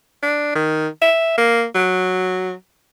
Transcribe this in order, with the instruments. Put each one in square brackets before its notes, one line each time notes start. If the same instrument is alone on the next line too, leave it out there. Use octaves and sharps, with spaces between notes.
[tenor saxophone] D4
D#3
E5
A#3
F#3